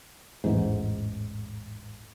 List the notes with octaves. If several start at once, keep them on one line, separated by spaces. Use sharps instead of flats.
A1 E2 G#2